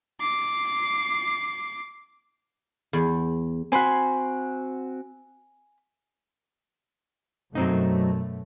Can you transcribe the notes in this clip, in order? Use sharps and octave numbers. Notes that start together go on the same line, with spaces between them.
D6 C7
E2
C4 F#4 G#5 B5 C6
F#2 B2 F#3 A3 C4 D#4